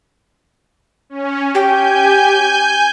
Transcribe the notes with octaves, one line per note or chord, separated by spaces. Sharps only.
C#4
G4 G#5 G6